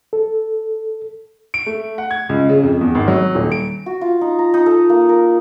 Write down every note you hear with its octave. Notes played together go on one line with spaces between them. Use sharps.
A4
D7
A3
F#5
G#6
C#2
C#3
F2
E2
G#1
F#3
D#1
D7
F#4
F4
D#4
A#5
D#4
A4
A#3
A#4